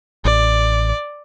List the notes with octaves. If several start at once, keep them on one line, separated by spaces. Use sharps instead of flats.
A1 D5